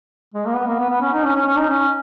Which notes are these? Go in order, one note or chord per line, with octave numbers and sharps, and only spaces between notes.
G#3
A#3
B3
A#3
B3
B3
C#4
D#4
C#4
C#4
C#4
D#4
C#4